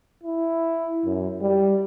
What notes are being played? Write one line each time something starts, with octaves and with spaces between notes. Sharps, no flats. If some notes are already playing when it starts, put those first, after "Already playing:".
E4
F#2
G3